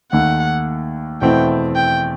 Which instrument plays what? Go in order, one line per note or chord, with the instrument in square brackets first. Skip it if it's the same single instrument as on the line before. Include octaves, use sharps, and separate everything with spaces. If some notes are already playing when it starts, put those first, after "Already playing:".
[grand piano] D#2 D#3 A3 [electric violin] F#5
[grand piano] E2 B2 A3 C4 E4 [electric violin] G5
[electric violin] G5